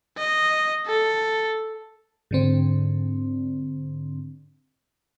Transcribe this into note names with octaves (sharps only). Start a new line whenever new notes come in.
D#5
A4
G#2 D3 C4